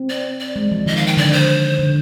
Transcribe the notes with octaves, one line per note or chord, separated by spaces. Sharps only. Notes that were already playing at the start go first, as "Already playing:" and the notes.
Already playing: C4
D5
D5
G#3
F3
D#3 D#5
F5
G5
D3 D5
C5
D3